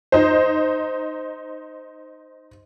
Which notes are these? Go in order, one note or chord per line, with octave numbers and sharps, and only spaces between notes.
D#4 C5